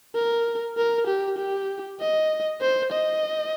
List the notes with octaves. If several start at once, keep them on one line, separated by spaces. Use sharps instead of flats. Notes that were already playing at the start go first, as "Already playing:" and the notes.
A#4
A#4
G4
G4
D#5
C5
D#5